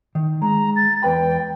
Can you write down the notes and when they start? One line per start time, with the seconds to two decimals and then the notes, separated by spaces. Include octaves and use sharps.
0.15 D#3
0.42 G#3 A#5
0.76 A6
1.03 E2 B4 G5 B5